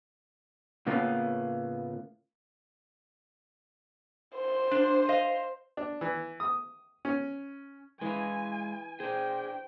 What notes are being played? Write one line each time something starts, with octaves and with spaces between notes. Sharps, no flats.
A2 C#3 A#3 B3 F4
C5
D4
D#5 F5
D4
E3
D#6
C#4
E3 G#3 D#5 F5 G#5
D4 G#4 C5 G5